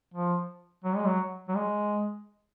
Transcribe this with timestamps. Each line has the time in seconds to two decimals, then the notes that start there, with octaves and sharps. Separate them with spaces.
0.14 F3
0.84 F#3
0.95 G#3
1.06 F#3
1.48 F#3
1.55 G#3